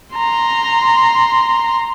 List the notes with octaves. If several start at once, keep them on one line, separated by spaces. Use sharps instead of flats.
A#5 C6